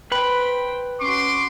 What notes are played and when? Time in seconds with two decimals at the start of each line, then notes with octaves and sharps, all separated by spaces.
0.12 B4 C5 G5 B5
0.99 C#4 F#4 C6 D6